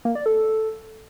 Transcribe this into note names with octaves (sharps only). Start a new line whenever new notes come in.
A#3
D5
A4